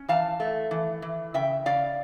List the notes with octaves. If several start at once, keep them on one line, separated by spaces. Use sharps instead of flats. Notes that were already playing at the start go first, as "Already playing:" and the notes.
Already playing: C#4
E3 F5 A5
A3
E3
E3
C#3 E5 G5
C#3 D5 F5